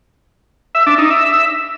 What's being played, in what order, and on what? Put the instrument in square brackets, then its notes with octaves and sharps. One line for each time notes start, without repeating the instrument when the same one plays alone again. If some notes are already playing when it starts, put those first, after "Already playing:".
[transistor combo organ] E5
D4
D#4
E5